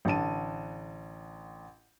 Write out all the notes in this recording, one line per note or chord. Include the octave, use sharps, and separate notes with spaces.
A1 D3 A5 D#7